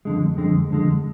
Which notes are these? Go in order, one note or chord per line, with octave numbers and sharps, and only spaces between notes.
F2 D3 G#3
F2 D3 G#3
F2 D3 G#3